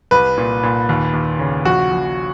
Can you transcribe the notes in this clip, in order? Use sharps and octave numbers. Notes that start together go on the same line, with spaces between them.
C2 B4
A#2
A#2
D#2
D#2
C#3
A#1 F#4
A#1